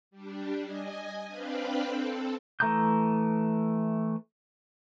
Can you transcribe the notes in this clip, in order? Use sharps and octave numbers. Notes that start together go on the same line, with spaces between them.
G3 D4
D#5 G#5
C4 D4 B4 F5 G5 B5
C4 A4
E3 A3 A#5 D#6 G6